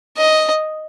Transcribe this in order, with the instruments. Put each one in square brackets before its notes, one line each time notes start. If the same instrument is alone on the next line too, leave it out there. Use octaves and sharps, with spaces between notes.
[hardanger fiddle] D#5